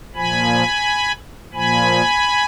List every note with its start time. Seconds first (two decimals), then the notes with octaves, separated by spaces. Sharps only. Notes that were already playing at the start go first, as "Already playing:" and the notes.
0.15 A#2 F3 G#5 B5
1.54 A#2 F3 G#5 B5